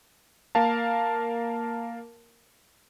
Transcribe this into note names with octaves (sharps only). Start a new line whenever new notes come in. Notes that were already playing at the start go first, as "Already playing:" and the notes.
A#3 A#4 F5 A5